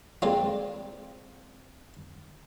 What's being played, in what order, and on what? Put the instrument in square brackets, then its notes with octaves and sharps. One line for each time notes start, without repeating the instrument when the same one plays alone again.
[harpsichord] G#3 A#3 F4 [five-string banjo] C4 D5